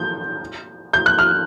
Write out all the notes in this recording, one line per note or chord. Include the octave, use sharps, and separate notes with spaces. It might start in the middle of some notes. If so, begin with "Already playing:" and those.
Already playing: G6
G6
F#6
F6